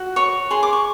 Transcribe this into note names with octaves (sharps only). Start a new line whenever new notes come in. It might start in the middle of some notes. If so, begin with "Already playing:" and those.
Already playing: F#4
C#5 C#6
G#4 C6
D6
C#6